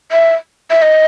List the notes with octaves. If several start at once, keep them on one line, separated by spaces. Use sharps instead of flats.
E5
E5
D#5